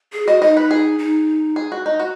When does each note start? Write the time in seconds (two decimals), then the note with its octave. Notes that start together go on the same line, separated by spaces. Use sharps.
0.13 G#4
0.27 F#4 D#5
0.42 D#4 D#5
0.57 B4
0.71 G#4
0.99 D#4
1.56 G#4
1.72 F#4
1.86 D#4
2.00 F#4